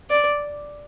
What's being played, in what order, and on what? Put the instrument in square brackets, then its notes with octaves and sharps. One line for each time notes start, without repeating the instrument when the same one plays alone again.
[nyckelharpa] D5